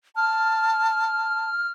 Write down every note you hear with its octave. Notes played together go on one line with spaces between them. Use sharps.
A5 F6